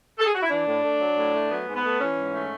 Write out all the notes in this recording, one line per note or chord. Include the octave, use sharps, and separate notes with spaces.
A4
G#4
F#4
E4
E3 D4
A2
A3
F#3
A2
A3
F#3 B3
G#2
B3
A3
E3 C#4
G#2
A3